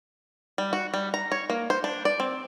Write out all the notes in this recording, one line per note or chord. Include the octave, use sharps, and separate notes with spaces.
G3
F#4
G3
A#5
C#5
A#3
C5
D4
D5
C4